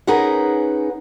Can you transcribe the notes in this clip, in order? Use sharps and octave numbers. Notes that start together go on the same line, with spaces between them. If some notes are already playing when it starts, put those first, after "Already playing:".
C#4 D#4 G#4 A#4 B4 F#5